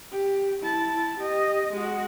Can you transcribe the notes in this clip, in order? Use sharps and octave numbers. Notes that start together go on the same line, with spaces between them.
G4
E4 A5
G4 D#5
G#3 F#4